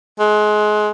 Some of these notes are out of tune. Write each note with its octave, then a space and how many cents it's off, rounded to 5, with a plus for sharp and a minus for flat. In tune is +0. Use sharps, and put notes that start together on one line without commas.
G#3 +25